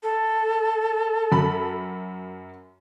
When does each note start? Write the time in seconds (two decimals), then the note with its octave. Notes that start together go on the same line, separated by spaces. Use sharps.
0.03 A4
1.32 F#2 B5